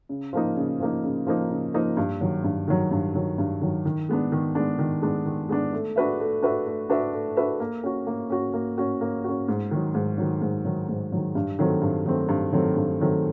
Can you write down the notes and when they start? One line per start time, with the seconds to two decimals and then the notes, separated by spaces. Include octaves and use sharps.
0.09 C#3
0.33 F3 A#3 D#4
0.56 C#3
0.80 F3 A#3 D#4
1.04 C#3
1.27 F3 A#3 D#4
1.50 C#3
1.74 F3 A#3 D#4
1.97 G2
2.21 D#3 F#3
2.44 G2
2.68 D#3 F#3
2.91 G2
3.15 D#3 F#3
3.38 G2
3.61 D#3 F#3
3.85 D#3
4.09 G#3 B3 D4
4.32 D#3
4.55 G#3 B3 D4
4.79 D#3
5.02 G#3 B3 D4
5.26 D#3
5.49 G#3 B3 D4
5.73 A3
5.96 D4 F#4 B4 E5
6.19 A3
6.43 D4 F#4 B4 E5
6.67 A3
6.90 D4 F#4 B4 E5
7.13 A3
7.37 D4 F#4 B4 E5
7.60 A#3
7.84 C#4 F#4
8.07 A#3
8.30 C#4 F#4
8.54 A#3
8.78 C#4 F#4
9.01 A#3
9.24 C#4 F#4
9.48 G#2
9.71 D#3 F#3
9.95 G#2
10.18 D#3 F#3
10.42 G#2
10.65 D#3 F#3
10.89 G#2
11.12 D#3 F#3
11.35 G2
11.59 D#3 F#3 A3 C4
11.82 G2
12.06 D#3 F#3 A3 C4
12.29 G2
12.52 D#3 F#3 A3 C4
12.76 G2
13.00 D#3 F#3 A3 C4